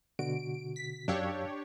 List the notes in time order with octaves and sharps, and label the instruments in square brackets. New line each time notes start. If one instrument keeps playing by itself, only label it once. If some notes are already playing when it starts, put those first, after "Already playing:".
[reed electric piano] B2 D3 F#4 [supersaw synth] D7
[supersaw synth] B6
[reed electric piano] F#2 F5 E6 [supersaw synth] D4 G4 C#5